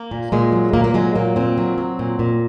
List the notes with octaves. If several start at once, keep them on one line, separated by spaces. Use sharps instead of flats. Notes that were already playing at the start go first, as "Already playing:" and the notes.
Already playing: A#3
A#2
A#2 G#3
F#3
A#2 A#3
A#3
F#3 G#3
A#2 A#3
A#2 C4
F#3
F#3
A#2
A#2